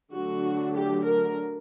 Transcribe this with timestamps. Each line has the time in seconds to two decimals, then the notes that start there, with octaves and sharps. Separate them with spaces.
0.12 D3 F#3 A3 D4 F#4
0.75 G4
1.06 A#4